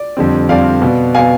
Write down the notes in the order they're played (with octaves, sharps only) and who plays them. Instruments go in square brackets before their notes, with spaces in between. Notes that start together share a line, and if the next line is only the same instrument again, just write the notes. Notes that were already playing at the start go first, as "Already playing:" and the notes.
Already playing: [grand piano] D5
F2 D3 G3 C4
F2 D3 G3 C4 D5 F5
B2 B3
B2 B3 F5 G#5